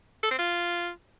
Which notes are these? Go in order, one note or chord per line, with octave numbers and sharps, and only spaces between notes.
A4
C4
F4